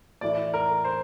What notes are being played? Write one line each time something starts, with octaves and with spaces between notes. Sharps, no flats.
A2 E3 D5
A#4
C5